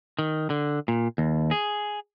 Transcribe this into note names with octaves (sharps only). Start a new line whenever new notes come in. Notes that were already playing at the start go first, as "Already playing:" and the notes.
D#3
D3
A#2
D#2
G#4